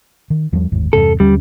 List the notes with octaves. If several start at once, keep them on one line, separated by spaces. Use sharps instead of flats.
D#3
E2 F3 G3
G1 D#2 G#2
E2 G2 C3 A4
D#2 D3 G3 C#4